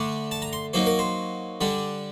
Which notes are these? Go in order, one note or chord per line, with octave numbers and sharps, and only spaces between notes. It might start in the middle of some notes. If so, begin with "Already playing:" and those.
Already playing: D3 A3 D4
A5
A#5
C6
F#3 A#3 D#4 C5
A#4
C5
D3 G3 D4